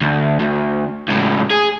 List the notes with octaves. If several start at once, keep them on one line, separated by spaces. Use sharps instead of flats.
D2
D2
C#2 A2
G#4